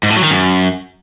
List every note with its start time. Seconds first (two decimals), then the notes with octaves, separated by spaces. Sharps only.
0.03 G#2
0.10 A2
0.17 F#3
0.24 D#3
0.30 F#2